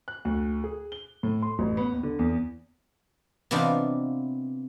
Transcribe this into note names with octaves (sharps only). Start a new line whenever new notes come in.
F#6
D2
G#4
G7
A2
C6
A1
B3
D#2
D3
E2
C3 E3 B3 D4 D#4 F4